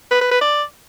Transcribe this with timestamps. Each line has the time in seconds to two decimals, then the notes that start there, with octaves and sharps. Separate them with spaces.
0.11 B4
0.21 B4
0.31 B4
0.41 D5